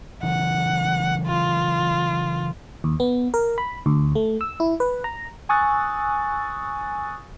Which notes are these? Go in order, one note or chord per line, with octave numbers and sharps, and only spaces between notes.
C#3 E3 F#3 F#5
F4
D#2
B3
A#4
B5
D2
A3
E6
E4
B4
A#5
G#5 C#6 D#6 E6 F#6 A6